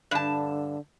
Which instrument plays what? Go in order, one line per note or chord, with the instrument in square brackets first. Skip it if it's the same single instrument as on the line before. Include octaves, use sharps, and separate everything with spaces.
[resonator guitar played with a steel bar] G2 A5 [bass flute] D3